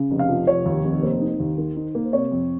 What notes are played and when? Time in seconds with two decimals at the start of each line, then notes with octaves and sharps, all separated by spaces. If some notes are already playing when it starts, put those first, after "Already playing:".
Already playing: C#3
0.11 F1
0.19 F5
0.29 F3
0.47 F1 C#5
0.66 D#2
0.84 F1
1.02 A#3 C5
1.21 D#4
1.40 D#2
1.58 D#3
1.77 D#4
1.95 A#3
2.05 C5
2.13 C3 C#5
2.31 F2